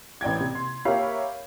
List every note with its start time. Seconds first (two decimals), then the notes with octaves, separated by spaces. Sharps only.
0.21 A1 D5 G5 G#6
0.40 C3
0.55 C6
0.85 G4 A#4 C#5 E5 F5 B5